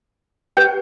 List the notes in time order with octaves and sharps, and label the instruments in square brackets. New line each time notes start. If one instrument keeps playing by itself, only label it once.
[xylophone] G4 B4 G5 G6